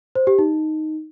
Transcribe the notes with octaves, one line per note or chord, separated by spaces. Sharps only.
C5
G4
D#4